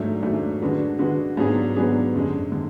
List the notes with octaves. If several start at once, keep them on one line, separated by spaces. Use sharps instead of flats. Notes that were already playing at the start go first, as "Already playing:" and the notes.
Already playing: G#2 F#3 A3 D4
G#2 F#3 A3 D4
D3 G#3 D4 F#4 B4
D3 G#3 D4 F#4 B4
G#2 F#3 B3 D4 G#4
G#2 F#3 B3 D4 G#4
F#2 D3 G#3
D3 G#3